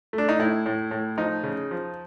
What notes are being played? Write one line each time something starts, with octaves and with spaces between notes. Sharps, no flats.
A3
D4
D#4
A2 E4
A2
A2
F3 D#4
C#3
F3